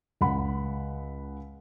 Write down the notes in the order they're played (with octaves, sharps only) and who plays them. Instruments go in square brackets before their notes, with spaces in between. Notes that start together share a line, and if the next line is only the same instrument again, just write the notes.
[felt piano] C#2 F#5 B5